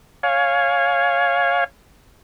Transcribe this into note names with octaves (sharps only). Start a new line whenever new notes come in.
C#5 F5 G#5